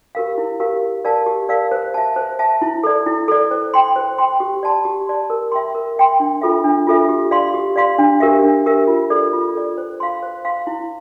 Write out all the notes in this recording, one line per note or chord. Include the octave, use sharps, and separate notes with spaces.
G4 A#4 F5
E4
G4 A#4 F5
G4
A#4 D5 F5 A5
G4
A#4 D5 F5 A5
C5
E5 A5
C5
E5 A5
E4
A4 D5
E4
A4 D5
C5
G5 C6
C5
G5 C6
G4
D5 A5 C6
G4
D5 A5 C6
A#4
E5 G5 C6
A#4
E5 G5 C6
D4
F4 A4 E5
D4
F4 A4 E5
G4
D5 F5 C6
G4
D5 F5 C6
D4
G4 A#4 E5
D4
G4 A#4 E5
F4
A4 D5
F4
A4 D5
C5
F5 C6
C5
F5 C6
E4